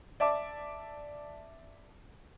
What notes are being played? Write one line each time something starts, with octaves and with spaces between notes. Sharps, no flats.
D5 E5 A5 D6